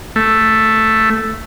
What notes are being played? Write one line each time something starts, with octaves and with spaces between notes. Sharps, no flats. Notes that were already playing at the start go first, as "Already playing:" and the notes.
A3